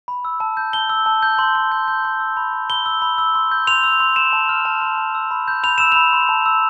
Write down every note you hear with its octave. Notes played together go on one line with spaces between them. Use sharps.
B5
E6
A5
G6
A5 G7
E6
A5
G6
C6
C6
G6
G6
C6
E6
B5
G6
B5 G7
E6
B5
E6
C6
G6
C6 F7
E6
C6
C6 E7
A5
F6
A5
C6
A5
E6
B5
G6
B5 F7
E6 E7
B5 F7
C6
A5
E6